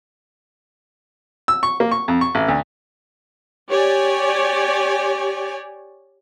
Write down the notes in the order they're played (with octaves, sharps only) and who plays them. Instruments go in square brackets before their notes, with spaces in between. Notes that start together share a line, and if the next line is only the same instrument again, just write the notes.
[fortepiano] E6
C#6
A#3
C#6
F2
C#6
A1
D2
[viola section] G4 C#5 D5 G#5